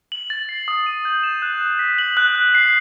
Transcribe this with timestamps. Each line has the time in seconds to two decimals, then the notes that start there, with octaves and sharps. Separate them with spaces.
0.12 F#7
0.30 A6
0.49 C7
0.68 D#6
0.86 D#7
1.05 G6
1.23 E7
1.42 F#6
1.61 F#6
1.79 B6
1.98 F#7
2.17 F#6
2.36 F#6
2.55 C7